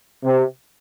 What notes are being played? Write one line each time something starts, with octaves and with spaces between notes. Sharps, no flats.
C3